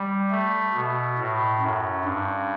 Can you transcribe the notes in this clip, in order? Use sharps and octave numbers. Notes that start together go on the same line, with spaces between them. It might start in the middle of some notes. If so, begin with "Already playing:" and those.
Already playing: G3
A3
B2
A2
F#2
G2